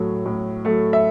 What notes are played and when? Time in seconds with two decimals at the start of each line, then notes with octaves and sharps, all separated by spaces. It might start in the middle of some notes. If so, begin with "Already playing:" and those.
Already playing: A2 F#3 A3
0.26 A2
0.65 F#3 A3
0.93 E5